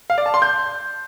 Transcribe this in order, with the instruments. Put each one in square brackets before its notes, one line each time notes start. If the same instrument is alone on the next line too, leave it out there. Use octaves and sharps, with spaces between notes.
[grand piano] F5
D5
A5
C6
G6